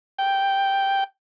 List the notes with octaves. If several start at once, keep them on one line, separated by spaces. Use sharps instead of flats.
G5